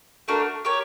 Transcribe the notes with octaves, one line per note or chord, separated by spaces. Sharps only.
A3 D4 F#4 A#4
G4 A#4 C#5